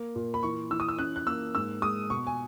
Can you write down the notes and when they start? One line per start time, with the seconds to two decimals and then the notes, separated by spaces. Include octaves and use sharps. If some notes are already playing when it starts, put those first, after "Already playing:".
Already playing: A#3
0.15 A#2
0.34 B5
0.43 E3 C#6
0.71 E3 E6
0.80 D#6
0.89 E6
0.98 C#4 F#6
1.16 F#6
1.26 A#3 E6
1.55 G#2 E6
1.82 G#3 D#6
2.10 B2 C#6
2.27 G#5